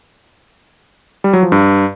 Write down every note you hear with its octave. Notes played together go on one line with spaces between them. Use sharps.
G3
F#3
F3
G2